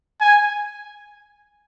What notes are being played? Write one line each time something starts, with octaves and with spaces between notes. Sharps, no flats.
G#5